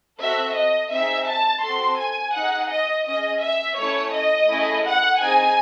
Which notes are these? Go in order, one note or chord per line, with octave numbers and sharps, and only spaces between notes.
C4 F#4 A4 E5
D#5
C4 D#4 G#4 E5
A5
C4 F#4 A4 C6
G#5
D#4 G#4 F#5
D#5
C#4 G#4 D#5
E5
A3 C#4 E4 C#5
D#5
A3 C#4 E4 G#4
F#5
C4 D#4 G#4 G#5